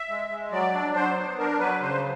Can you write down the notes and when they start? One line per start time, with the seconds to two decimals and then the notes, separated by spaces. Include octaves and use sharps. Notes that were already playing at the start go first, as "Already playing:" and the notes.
Already playing: E5
0.09 G#3
0.30 G#3
0.52 F#3 D5
0.73 D4
0.95 F#3 C5
1.17 B3
1.38 D4 A#4
1.60 F#3 B4
1.81 C#3 C5